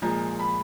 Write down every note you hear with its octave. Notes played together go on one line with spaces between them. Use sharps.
A#2 F3 G#3 A#5
B5